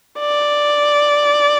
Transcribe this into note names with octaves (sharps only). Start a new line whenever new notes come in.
D5